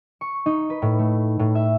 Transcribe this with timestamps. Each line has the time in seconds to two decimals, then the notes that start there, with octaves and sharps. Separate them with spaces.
0.21 C#6
0.46 D#4
0.70 B4
0.82 A2
0.99 A3
1.39 A2
1.55 E5